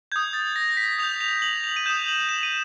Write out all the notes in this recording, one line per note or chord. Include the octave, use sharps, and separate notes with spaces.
D#6 G6 G#6
A6
A#6
A#6
B6
D#6 G6 F7
F7
F#7
F7
D#7
D#6 G6 E7
F#7
E7
D#7